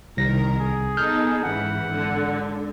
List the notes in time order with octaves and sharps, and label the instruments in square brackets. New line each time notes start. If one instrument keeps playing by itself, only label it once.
[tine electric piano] C2 A#6 [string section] D#3 A#4
[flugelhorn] G#4
[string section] B3 D#4 A4 [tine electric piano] F6 G6
[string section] G#2 C#3 E3 [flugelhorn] F#5
[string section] G#1 D3